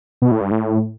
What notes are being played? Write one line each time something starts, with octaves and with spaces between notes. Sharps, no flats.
B2
A2
G2
A2